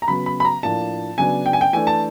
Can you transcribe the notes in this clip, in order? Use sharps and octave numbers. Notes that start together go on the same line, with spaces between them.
A#5
C#3 F#3 B3 B5
B5
B5
A#5
A2 F3 A#3 D4 A5
C#3 F#3 B3 D4 G#5
G5
G#5
G5
E3 A3 D4 G#5
A5